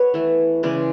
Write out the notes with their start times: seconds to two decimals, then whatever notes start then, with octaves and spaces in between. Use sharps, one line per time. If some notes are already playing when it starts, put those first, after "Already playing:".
Already playing: B3 B4 C#5
0.14 E3 A3
0.63 C#3 E3 G#3 D5